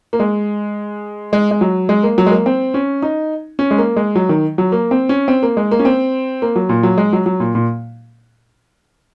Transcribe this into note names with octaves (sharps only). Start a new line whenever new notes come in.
A#3
G#3
G#3
G#3
F#3
G#3
A#3
F#3
G#3
A#3
C4
C#4
D#4
C#4
G#3
A#3
G#3
F#3
D#3
F#3
A#3
C4
C#4
C4
A#3
G#3
A#3
C#4
C4
A#3
F#3
A#2
F#3
G#3
F#3
F#3
A#2
A#2